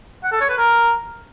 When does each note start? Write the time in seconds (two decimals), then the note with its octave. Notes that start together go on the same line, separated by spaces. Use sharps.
0.23 F#5
0.32 A4
0.41 C#5
0.49 B4
0.58 A#4